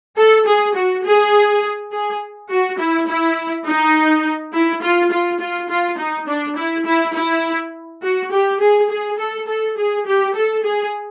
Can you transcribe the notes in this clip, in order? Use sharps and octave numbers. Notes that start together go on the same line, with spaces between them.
A4
G#4
F#4
G#4
G#4
F#4
E4
E4
D#4
E4
F4
F4
F4
F4
D#4
D4
E4
E4
E4
F#4
G4
G#4
G#4
A4
A4
G#4
G4
A4
G#4